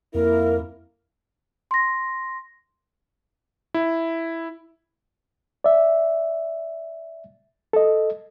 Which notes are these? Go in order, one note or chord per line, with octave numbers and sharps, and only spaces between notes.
F2 A#3 E4 A#4
C6 A#6
E4
D5 E5
A4 D#5